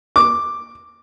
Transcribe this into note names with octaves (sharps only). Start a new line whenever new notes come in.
D6